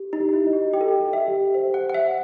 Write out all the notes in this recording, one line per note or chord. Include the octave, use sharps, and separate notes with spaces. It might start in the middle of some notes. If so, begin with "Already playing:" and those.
Already playing: G4
D#4
G4
D#4
E4
D#5
F#4
G4 G5
A4
G4
G4
E5
G4
C5 E5
F#5
C5
F#5
E5
F#5